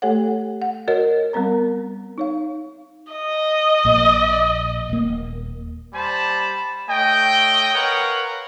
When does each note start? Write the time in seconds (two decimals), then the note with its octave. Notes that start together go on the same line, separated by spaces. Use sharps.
0.02 A3 G4 A4 C#5 F#5
0.62 F#5
0.88 F#4 A#4 C#5 D#5
1.33 G3 B3 C4 A#4 A#5
2.18 D#4 C#5 F5
3.13 D#5
3.85 A#1 A#2
4.89 D#1 A#3
5.94 G3 C5 A5 B5
6.89 A3 C#5 D#5 G5
7.75 A#4 B4 C#5 F5 F#5